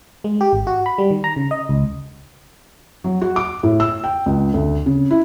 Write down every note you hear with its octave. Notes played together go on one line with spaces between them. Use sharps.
G#3
G4
G#1
F#4
B5
G3
D#3
A#5
C#3
D#5
C#2
F#3
F#4
D6
A2
E6
G5
C#2
D2
C#3
E4